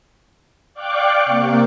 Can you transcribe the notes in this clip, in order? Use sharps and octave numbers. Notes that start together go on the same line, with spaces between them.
D5 F5 G5 C#6 D6 F#6
C3 A#3